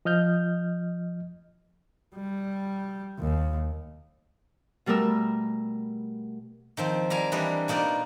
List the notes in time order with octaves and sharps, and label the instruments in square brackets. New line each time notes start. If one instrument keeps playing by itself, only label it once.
[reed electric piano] F3 D#5 F6 G6
[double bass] G3
D#2
[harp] B2 G3 A3 A#4 E6
[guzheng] D#3 F3 C4
G3 A#4 F5 G#5
E3 G3 D4 D#5
B2 A#3 D#4 F4 D5